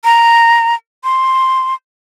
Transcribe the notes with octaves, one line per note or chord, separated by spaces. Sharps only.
A#5
C6